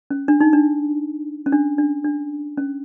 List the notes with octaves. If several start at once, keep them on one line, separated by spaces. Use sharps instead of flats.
C#4
D4
D#4
D4
C#4
D4
D4
D4
C#4